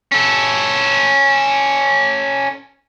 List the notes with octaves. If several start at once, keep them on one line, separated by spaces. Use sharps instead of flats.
C#4 A4